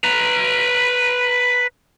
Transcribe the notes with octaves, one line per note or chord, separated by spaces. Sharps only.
B4 A#5